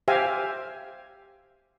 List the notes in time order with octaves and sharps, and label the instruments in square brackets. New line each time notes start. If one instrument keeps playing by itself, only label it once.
[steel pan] G4 C5 E5 F5 G5 G#5